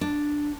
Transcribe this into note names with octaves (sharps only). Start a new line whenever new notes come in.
D4